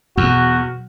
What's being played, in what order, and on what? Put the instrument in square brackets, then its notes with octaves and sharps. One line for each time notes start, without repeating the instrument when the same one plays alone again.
[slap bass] E2 [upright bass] B2 F#3 [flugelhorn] F#4